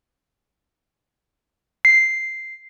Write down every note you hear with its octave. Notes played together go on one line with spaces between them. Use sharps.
C7